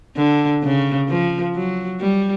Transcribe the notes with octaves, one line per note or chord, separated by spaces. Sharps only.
D3
C#3
F3
F#3
G3